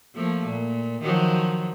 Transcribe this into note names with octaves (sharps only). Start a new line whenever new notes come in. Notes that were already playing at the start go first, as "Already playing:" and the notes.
F3 A3 A#3
A#2
D#3 F3 F#3